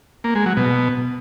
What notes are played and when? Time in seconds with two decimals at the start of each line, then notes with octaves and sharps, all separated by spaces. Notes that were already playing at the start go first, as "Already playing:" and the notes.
0.24 A#3
0.35 G#3
0.46 F#3
0.57 B2